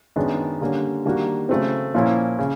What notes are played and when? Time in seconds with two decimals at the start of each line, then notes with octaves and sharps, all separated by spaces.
0.16 F#2 D#3 G#3 B3 D4
0.61 D3 G3 A#3 C#4
1.05 D#3 G3 A#3 D4 F#4
1.49 C#3 F#3 A3 C4
1.94 A#2 F3 A#3 C#4 E4
2.39 C#3